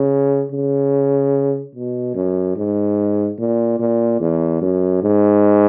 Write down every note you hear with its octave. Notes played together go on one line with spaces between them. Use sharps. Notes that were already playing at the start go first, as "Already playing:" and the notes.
Already playing: C#3
C#3
B2
F#2
G#2
A#2
A#2
E2
F#2
G#2